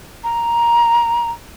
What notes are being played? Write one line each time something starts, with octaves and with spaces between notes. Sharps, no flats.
A#5